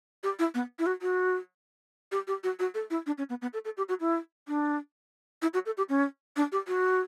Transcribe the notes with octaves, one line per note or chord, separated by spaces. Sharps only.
G4
E4
B3
E4
F#4
F#4
G4
G4
F#4
F#4
A4
E4
D4
C#4
B3
B3
A4
A4
G4
F#4
E4
D4
E4
F#4
A4
G4
C#4
D4
G4
F#4